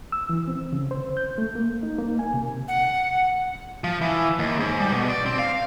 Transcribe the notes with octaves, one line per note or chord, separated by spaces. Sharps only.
E6
E3
C4
C#3
C5
G6
A3
A#3
D#4
A#3
G#5
C3
F#5
F3
E3
D#2
G#2
G3
B2
D5
C4
F5